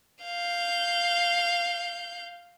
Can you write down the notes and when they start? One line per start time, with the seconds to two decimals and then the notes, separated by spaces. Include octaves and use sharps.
0.24 F5 G6